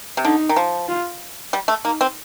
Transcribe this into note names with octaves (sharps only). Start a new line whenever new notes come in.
C3
D3 D#4
D#3
F3
F4
G3
A3
A#3 D#4
C4